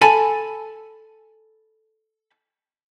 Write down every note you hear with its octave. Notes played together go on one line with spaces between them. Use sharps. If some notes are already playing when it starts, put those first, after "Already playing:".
A4 G#5 A5 B5